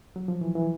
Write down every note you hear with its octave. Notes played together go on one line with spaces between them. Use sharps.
F#3
F3
E3
E3